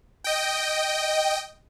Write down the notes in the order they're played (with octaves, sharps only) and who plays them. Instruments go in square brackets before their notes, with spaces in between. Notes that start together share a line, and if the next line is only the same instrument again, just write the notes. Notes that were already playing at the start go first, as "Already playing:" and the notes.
[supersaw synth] D#5 G5